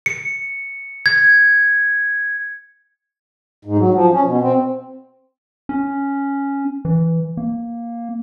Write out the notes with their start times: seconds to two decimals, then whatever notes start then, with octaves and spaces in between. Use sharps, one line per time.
0.06 C#7
1.06 G#6
3.65 G#2
3.78 F#3
3.94 F3
4.13 C#4
4.25 B2
4.41 C4
5.69 C#4
6.85 E3
7.37 A#3